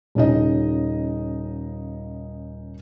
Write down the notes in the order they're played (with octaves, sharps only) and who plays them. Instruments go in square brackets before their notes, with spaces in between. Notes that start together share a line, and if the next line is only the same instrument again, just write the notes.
[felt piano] D#1 C#3 D#4 D#5